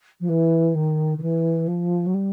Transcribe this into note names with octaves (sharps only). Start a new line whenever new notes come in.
F3
E3
D#3
D#3
E3
F3
F#3
G3